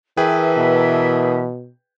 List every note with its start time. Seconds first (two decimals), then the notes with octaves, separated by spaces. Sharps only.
0.17 E3 G#4 A#4 B4 E5 G5 A5
0.57 B2